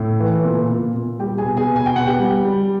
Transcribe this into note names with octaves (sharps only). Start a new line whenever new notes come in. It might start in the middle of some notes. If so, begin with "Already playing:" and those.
Already playing: A2 A4
E3
A#2
A#2
A#2
G3 G4 G5
G#4 G#5
B2
G#4 G#5
B2
G#5
G5
B2 F#5
G4 G5
G3
G3